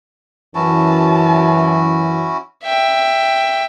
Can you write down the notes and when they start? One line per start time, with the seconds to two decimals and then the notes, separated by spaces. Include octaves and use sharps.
0.55 F#2 E3 C#4 E4 F#4 A5
2.63 E5 G5